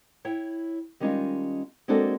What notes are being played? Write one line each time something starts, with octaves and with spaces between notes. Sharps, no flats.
E4 C#5 G5
D#3 G3 G#3 C#4 D#4 F4
G#3 A#3 C4 D4 F#4 A4